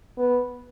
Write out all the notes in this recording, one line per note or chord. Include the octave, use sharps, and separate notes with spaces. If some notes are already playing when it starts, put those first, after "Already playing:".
B3